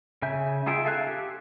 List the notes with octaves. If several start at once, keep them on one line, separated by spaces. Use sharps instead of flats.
C#3 E5 G#5 G6
D#4 F4 G#4 E5 G5
A4 E5 F5 G#5 F#6
G4